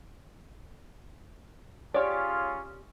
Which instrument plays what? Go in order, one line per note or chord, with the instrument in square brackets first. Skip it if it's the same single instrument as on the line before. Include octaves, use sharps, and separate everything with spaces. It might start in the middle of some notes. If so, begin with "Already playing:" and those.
[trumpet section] C#4 F4 G#4 [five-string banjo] G4 C#5 D5